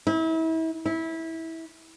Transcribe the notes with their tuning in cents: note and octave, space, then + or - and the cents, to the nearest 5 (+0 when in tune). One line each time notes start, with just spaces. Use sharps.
E4 -35
E4 -20